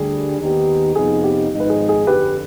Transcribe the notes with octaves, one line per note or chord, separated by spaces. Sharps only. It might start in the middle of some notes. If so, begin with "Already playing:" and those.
Already playing: D2 D3 G3 D4 G#4
D#2 D#3 B3 D#4 G4
F2 C3 F3 B3 D#4 G#4
G4
G#1 G#2 F3 C4 D#4
B4
G#4
G#4
G1 F2 D3 G4 B4